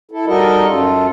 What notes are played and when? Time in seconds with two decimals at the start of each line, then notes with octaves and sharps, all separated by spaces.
0.11 E4 A4
0.28 G3 D#4 F#4 A4 A#4 D#5
0.66 F#2 F4 A4